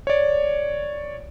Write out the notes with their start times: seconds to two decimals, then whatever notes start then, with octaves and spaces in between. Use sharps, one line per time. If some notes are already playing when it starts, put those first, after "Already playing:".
0.07 C#5 D5